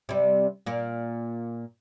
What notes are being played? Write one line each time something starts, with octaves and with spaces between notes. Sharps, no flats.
C3 G3
A#2 A#3